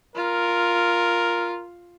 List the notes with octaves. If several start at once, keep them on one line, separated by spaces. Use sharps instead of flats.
F4 A#4